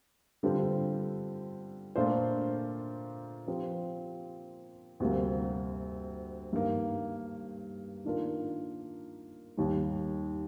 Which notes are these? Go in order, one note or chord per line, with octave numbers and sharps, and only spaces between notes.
D3 G3 C4 F4 A4
A#2 A3 D4 F4 C5
F3 C4 G4
D2 C3 G3 A#3
G2 D#3 A#3
D#3 A#3 D4 F4 A#4
D#2 D#3 G3